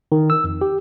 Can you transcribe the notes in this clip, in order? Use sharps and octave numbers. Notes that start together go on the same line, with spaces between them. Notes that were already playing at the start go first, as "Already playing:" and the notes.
D#3
E6
F2
G4